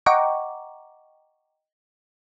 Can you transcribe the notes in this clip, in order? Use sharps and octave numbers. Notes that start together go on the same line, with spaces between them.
D#5 F#5 G5 A#5 C#6 D6